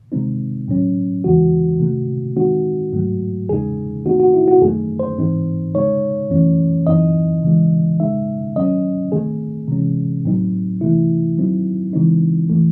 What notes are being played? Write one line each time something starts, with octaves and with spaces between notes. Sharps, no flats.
C3 D#3 G#3 C4 D#4
A2 F#3 C#4
E2 C#3 E3 G#3 F#4
C3 D#3 A3
D#3 G#3 C4 D#4 F#4
G#2 F#3 A3
E2 C#3 G#3 D#4 G#4
D#3 A3 C4 D#4 F#4
F#4
E4
F#4
F#2 D#3 A3 D#4 G#4
C5
G#2 E3 C4 D#4
C#3 G#3 D#4 C#5
F#2 E3 A3 C#4
F#2 E3 C4 D#4 D#5
C#3 E3 G#3
C#3 G#3 D#4 E5
D#3 F#3 C#4 D#5
D#3 A3 C4 G#4
C3 E3 G#3 C#4
A2 F#3 C4 D#4
C3 E3 A3 E4
D#3 F#3 C4 D#4
C#3 E3 G#3 C4 D#4
E3 A3